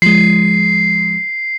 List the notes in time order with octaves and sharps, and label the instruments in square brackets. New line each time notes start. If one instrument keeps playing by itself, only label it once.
[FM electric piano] F3 G#3 [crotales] C7